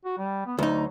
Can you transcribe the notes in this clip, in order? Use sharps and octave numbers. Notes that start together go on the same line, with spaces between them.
F#4
G3
B3
D2 F#3 D#4